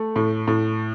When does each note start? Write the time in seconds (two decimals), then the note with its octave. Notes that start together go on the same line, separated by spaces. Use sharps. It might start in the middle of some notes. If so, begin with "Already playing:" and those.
Already playing: A3
0.16 A2
0.48 A2